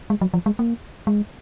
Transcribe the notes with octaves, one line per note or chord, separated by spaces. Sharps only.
G#3
F#3
F3
G#3
A#3
G#3